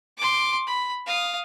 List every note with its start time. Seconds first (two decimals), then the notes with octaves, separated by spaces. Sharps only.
0.18 C6 D6
0.67 B5
1.06 F5 D#6